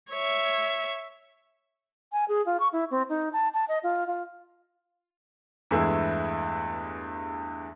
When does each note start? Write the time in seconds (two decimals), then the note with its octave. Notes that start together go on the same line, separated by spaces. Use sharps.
0.10 C#5 E5
2.12 G#5
2.29 G#4
2.46 F4
2.60 C#6
2.73 E4
2.91 C4
3.09 D#4
3.33 A5
3.54 A5
3.69 D#5
3.83 F4
4.07 F4
5.71 E2 G2 E3 G#3 A3 E4